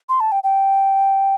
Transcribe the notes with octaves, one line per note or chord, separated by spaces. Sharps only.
C6
A5
G5
G5